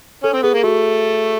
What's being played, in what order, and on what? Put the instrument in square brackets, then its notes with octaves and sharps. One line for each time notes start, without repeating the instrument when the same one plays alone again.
[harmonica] C#4 [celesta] A4
[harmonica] C4
[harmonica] B3 [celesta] G#4
[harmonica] A#3
[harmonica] A3 [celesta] F#4